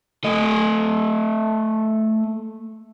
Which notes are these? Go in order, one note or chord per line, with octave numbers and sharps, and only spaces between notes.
A3 D#5